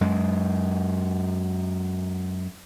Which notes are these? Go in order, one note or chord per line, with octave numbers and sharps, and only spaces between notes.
F#2 G#3